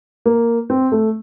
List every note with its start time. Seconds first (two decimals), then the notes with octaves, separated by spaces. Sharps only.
0.26 A#3
0.70 C4
0.92 A3